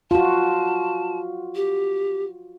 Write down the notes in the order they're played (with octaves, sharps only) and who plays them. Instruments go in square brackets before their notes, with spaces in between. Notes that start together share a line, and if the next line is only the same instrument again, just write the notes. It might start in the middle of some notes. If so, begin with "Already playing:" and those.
[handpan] F4 F#4 [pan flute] A5
[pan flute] G4